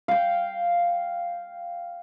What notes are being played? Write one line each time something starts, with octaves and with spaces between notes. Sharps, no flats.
F5 G5